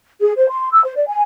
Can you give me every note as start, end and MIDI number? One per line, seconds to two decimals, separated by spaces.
0.20 0.32 68
0.37 0.46 72
0.50 0.68 84
0.72 0.82 88
0.84 0.93 72
0.96 1.05 74
1.07 1.22 80